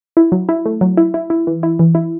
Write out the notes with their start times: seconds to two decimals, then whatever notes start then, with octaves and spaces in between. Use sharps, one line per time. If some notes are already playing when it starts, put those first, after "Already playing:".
0.17 E4
0.32 F#3
0.49 E4
0.66 A3
0.81 F#3
0.97 E4
1.14 E4
1.30 E4
1.47 E3
1.63 E4
1.79 E3
1.95 E4